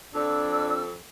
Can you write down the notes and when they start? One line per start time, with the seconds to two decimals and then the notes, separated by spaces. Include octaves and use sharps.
0.15 F2 D4 D5 E6